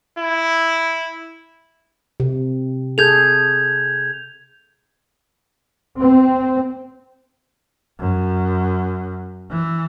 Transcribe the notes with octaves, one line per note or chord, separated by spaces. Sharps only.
E4
C3
G#4 A4 G6 G#6 F7
C4
F#2
E3